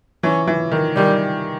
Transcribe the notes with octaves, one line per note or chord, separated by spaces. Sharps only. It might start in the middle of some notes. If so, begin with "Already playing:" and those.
E3 C#4
E3
D#3
D#3 G3